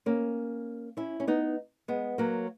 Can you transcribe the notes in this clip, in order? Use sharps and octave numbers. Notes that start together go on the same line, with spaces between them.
A#3 C#4
C#4 E4
C#4
B3 D#4
G#3 B3
F#3 A#3